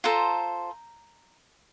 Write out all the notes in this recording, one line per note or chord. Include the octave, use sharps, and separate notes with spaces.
F4 A4 C5 A#5